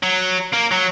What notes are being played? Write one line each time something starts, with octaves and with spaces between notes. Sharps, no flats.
F#3
A#3
F#3